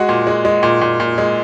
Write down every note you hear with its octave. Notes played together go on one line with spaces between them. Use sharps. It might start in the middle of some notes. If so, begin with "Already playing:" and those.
Already playing: G#3 F#4
A#2
G#3
G#3
A#2
A#2
A#2
G#3